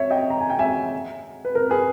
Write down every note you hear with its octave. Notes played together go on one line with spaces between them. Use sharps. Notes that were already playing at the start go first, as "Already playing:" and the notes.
Already playing: C#5 E5
D#5 G5
A#5
G#5
G5
E5 G#5
B4
A#4
G#4 B4